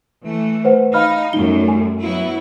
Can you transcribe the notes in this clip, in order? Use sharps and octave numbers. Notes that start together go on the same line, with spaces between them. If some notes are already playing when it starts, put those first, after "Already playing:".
E3 A3
B4 C5 F#5
D#4 F5 B5 F6
F#2 G3 A3 D#4 G7
G#5
F#3 B3 E4